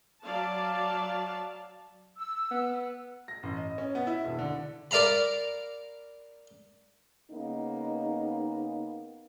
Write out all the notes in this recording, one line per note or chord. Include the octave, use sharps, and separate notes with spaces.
F#3 D5 F5 A5
E6
B3
A#6
A1
D#5
C#4
B3
E4
E1
D3
A#4 D5 F5 A#5 B5
C#3 A#3 B3 D#4